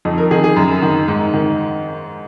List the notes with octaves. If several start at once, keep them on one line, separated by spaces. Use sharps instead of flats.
F2 D#4
A#4
D#3 G#4
G#4
F#2
D#3
G#2
D#3